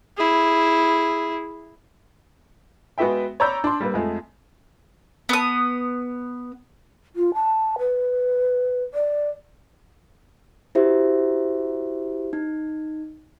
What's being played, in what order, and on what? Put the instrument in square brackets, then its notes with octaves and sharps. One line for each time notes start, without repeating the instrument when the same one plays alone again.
[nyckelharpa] E4 G#4
[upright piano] G#3 B3 F#4 B4 E5 G5
C#5 D5 A#5 B5 E6 G6
D4 C6
G3 A#3 B4
F2 G#3 A3
[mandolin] B3 D#6
[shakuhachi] F4
A5
B4
D5
[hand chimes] E4 F#4 G4 C5 E5
D#4